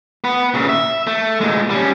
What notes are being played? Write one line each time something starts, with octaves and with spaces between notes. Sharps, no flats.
B3 B4
A#2 C#3
E5
A3
A#2 G#3
G3 C#4